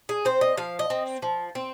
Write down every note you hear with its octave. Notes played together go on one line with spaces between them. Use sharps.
G#4
C4 C5
D#5
F3 F5
D#5
C4
F3
C4